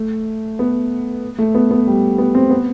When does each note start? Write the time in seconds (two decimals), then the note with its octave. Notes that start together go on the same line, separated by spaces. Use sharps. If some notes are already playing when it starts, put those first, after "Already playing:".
Already playing: A3
0.59 B3
1.38 A3
1.55 B3
1.71 B3
1.87 G3
2.18 B3
2.35 C4
2.50 B3